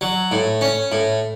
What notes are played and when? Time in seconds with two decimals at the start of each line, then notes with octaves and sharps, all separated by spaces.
0.01 F#3
0.31 A2
0.61 C#4
0.92 A2